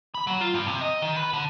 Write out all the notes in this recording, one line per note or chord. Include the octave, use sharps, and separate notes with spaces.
B5
F#3
F4
G2
C3
D#5
D#3
B4
D3